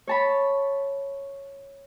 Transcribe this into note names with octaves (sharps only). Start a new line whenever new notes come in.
C#5 A5 B5